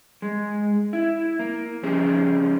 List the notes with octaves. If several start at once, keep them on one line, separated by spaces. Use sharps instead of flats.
G#3
E4
A#3
C#3 F3 C#4 G4 G#4 C5